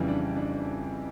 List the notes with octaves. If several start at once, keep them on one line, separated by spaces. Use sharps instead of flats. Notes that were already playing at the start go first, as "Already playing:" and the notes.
Already playing: F2 C#3 E3 G3
D4
D4